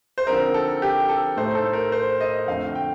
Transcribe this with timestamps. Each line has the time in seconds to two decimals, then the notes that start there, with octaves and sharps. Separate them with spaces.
0.18 C5
0.27 D3 F3 C4 D#4 A#4
0.54 A4
0.82 G4
1.09 A4
1.37 A2 A3 D#4 C5
1.55 A4
1.73 A#4
1.92 C5
2.21 D#5
2.37 D#5
2.47 F2 D3 A3 F5
2.75 G5